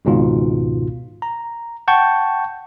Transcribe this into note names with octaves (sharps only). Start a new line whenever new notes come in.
G#1 C#2 G#2 B2 F4
A#5
F#5 G5 A5 C#6 G6